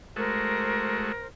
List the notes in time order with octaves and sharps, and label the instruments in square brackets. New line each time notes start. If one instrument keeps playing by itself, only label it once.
[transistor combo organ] G#3 A3 F#4 [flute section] A#4 C5